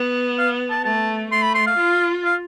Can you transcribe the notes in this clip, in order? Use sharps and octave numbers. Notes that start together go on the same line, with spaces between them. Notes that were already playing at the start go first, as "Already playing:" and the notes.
Already playing: B3
F5
A5
A3 A5
A3 C6
B5
C6
F5
F4
F5